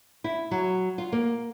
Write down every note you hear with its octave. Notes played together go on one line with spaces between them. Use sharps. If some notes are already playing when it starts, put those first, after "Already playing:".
E4
F#3
F4
A#3